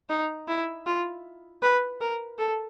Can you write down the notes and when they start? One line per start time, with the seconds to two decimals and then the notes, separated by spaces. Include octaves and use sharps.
0.09 D#4
0.48 E4
0.86 F4
1.62 B4
2.01 A#4
2.38 A4